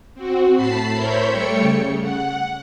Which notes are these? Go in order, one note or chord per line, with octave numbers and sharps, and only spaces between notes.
C4 F#4
A2 A5 B5 C7
A#4 C5 C#5 E5 B5 G6
G3 A3 A4 C#5 G5 C#7
C#3
F#5